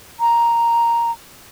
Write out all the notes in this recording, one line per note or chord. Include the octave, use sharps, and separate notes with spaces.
A#5